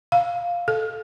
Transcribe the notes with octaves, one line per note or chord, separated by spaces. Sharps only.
F5
A4